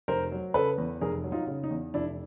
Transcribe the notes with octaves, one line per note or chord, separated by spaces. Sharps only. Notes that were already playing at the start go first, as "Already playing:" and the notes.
F1 A#4 C5
F#3
C#3 A4 B4
E2
F1 G#4 A#4
F#3
D#4 F4
C#3
D#4
E2
F1 D4 E4